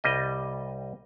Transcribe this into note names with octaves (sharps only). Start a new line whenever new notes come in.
C2 G3 D#5